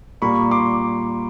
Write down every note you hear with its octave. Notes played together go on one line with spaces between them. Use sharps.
A#2 G3 A#3 B5 C#6
C6 D6